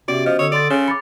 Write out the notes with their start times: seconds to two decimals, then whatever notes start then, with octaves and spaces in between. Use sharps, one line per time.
0.08 C3 B3 C#4 F#4 D5
0.26 F3 D#5
0.39 D3 C#5 D#6 E6
0.52 A4 D5 C6 A6
0.70 C#3 C#4
0.88 B5 D6 A6 C#7